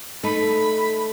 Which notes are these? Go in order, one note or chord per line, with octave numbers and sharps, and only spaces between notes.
A3 D#4 B5